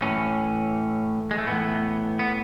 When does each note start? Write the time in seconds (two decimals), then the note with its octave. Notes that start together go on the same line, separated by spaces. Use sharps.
0.02 A2 E3 C#4
1.31 G#3
1.38 A3
1.46 A2 E3 B3
2.19 B3